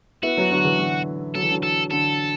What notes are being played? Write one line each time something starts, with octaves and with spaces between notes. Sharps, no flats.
B3 E4 F#4
F#3 B3
D3 F#3
E3
D3 F#3
F#3 A4
E3
D3 F#3
A4
D3 A4